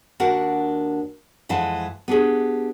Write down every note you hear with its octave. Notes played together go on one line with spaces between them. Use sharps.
D#2 D4 F#4 A#4 F#5
F2 E3 G#3 F#5 A5
B3 D4 G4 G#4